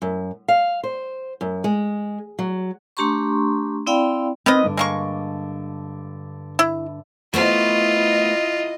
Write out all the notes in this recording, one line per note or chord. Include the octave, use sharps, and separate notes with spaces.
F#2
F5
C5
F#2
G#3
F#3
A3 D4 G4 A#5 C6 C#6
C4 E4 D5 F5 G5 B5
D#3 C4 D#4 B4 D#5
G2 D3
G#3 A#3 C#6
E4
A3 B3 E4 F4 C5 D#5